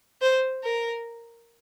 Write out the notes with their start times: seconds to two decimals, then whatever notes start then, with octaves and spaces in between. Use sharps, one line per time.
0.22 C5
0.64 A#4